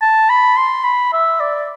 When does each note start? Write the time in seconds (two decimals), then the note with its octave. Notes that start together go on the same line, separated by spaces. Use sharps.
0.02 A5
0.30 B5
0.57 C6
0.84 B5
1.13 E5
1.40 D5